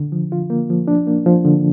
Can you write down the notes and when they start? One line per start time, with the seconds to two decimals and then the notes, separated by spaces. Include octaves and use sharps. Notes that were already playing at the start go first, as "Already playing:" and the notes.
Already playing: D3
0.12 F3
0.32 F4
0.50 A#3
0.70 F3
0.88 D4
1.07 A#3
1.26 F3
1.45 D3